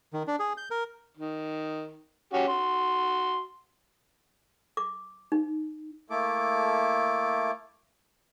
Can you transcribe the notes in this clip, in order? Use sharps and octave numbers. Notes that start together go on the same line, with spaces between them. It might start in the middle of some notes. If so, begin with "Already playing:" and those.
D#3
D4
G#4
G6
A#4
D#3
C#4 F#4 G4
F#4 C6
D6
D#4
A3 A#3 E4 A4 D6